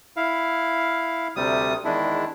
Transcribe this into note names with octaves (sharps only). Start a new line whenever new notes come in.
E4 F5
D2 C3 G3 D#6
E2 D#3 G#3 D4 E4